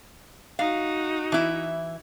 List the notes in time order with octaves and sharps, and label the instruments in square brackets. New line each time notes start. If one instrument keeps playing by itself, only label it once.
[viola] D#4 F#4 [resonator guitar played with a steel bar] F5
[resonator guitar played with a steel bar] E3 E4